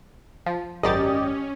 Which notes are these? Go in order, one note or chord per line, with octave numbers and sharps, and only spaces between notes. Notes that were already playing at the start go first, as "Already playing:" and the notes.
F3
G#1 F#2 C#4 G4 D5 D#5 A6